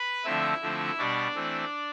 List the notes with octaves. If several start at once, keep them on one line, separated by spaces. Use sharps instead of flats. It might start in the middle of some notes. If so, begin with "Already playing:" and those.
Already playing: B4 B5
D3 F3 A3 C4 E4 E5
D3 F3 A3 C4
B2 G3 B3 D4 D5
E3 A3 C4